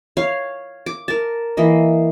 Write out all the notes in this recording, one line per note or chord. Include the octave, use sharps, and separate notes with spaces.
C#5 F5
D6
A#4 A5
E3 A#3 D#5